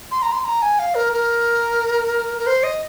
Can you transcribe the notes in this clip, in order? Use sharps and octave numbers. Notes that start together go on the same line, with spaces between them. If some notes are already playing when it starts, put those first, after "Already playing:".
C6
A#5
C6
A#5
G#5
F5
A#4
A#4
A#4
C5
D#5